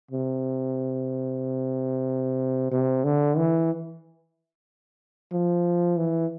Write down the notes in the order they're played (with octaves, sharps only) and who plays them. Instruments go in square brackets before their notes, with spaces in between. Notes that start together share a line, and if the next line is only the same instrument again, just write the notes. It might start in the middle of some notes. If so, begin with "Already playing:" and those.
[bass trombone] C3
C3
D3
E3
F3
E3